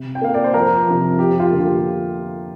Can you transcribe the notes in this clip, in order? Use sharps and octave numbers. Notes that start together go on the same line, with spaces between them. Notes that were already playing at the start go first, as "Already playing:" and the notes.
Already playing: C3
G5
A#3 F5
D5
C5
F2 A#4
C3 F3
F2 G4
F4
D3 A#3
G4